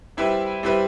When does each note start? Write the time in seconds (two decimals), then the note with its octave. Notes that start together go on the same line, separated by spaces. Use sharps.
0.17 G3 C4 E4 G4 B4
0.63 G3 C4 E4 G4 B4